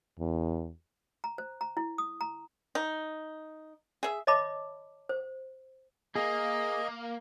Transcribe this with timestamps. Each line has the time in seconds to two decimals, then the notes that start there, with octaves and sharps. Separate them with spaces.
0.19 E2
1.24 A#5
1.38 C5
1.61 A#5
1.77 E4
1.98 D#6
2.21 A#5
2.75 D#4
4.03 G#4 E5
4.27 C#5 D#5 E5 A5 B5 D6
5.09 C5
6.16 A#3 G#4 D#5